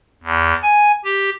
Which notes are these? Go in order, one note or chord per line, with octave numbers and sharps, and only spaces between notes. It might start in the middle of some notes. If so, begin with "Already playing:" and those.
E2
G#5
G4